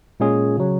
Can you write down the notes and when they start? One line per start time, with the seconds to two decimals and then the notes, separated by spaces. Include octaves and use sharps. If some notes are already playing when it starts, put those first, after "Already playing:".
0.20 A#2 G#3 C#4 F4 G#4
0.57 C#3 F#3